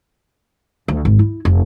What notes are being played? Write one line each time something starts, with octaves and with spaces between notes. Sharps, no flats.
D2
G#1
E4
F1